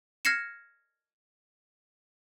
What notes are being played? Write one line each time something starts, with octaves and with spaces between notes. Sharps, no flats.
F6 G#6 A#6 C7 C#7 E7